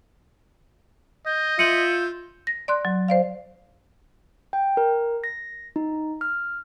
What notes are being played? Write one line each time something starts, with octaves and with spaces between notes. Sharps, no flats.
D#5 G6
F4 E5 G6 C#7 D#7 F#7
A#6
D5 C6 F#6
F#3
C5 D5 F5
G5
A#4
A#6
D#4
F6